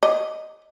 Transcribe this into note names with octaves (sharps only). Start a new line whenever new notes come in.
D#5